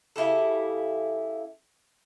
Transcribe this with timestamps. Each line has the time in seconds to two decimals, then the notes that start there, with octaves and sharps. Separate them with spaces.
0.16 C#3 E4 G4 A4